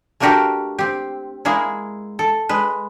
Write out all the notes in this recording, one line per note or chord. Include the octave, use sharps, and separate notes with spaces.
A3 A#3 D4 F#4 G4 A#4
C4 G4
G#3 A#3 E4 G#4
A4
G#3 B4